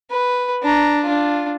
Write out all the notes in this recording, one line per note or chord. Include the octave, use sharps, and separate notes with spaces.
B4
D4 A#5
D4 F4